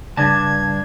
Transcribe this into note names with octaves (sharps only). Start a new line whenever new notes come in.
G2 C#3 D4 A5 G#6